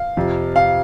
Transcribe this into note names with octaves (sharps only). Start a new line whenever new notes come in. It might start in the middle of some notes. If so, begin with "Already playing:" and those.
Already playing: F5
F2 C3 F3
F5